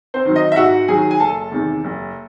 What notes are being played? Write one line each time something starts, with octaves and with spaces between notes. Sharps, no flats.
C4 C5
D#3 F#3
D#4 D#5
E5
G#2 F#4 F#5
D#3 F#3 G#4 G#5
G#5
F#1 A4 A5
E2 C3 D#3
F#1